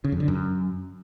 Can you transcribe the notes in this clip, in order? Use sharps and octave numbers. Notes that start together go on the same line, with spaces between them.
C#3
F2
D3
F#2